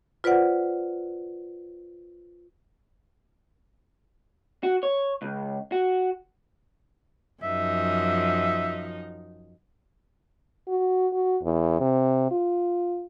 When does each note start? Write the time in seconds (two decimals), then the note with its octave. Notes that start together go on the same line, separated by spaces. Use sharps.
0.24 F4 B4 C5 D5 F#5
4.63 F#4
4.83 C#5
5.22 C#2
5.72 F#4
7.43 F#2 F3 D#4 E5
10.68 F#4
11.13 F#4
11.43 E2
11.80 C3
12.31 F4